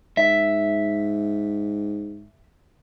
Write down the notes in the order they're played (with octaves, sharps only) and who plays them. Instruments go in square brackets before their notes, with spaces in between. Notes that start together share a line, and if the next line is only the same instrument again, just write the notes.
[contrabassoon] G#2 [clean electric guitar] E5